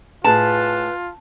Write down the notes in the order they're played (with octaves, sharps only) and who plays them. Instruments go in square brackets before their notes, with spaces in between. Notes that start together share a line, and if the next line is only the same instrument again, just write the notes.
[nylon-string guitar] A2 G#4 [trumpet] F4 [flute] B4 [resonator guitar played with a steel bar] A5